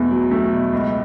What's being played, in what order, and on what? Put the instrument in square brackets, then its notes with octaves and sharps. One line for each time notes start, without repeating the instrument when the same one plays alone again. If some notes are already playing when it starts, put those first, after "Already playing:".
Already playing: [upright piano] E2 B2 A3
F#3
A3
B2
C#2